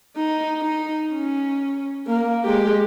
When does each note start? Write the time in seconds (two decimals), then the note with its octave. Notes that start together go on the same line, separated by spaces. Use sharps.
0.16 D#4
0.61 D#4
1.13 C#4
2.07 A#3
2.44 G#3 G4